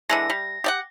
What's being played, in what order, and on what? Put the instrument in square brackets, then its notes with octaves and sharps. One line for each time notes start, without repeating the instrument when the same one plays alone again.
[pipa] D3 E3 G#3 [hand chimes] A#6
[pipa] G3
G4 D5 F#5